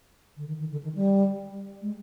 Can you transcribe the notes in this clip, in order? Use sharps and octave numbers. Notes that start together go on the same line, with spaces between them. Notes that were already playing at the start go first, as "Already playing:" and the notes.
D3
D#3
D#3
D3
D#3
G3
G#3